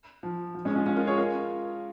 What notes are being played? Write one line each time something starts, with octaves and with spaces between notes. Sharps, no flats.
F3
F3
G#3 C#4
C#4 F4
C#4 F4
F4 A#4
G#4 C#5
F4 A#4